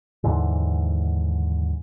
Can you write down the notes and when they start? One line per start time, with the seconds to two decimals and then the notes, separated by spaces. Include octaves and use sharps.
0.24 D#2 G#2 D3 E3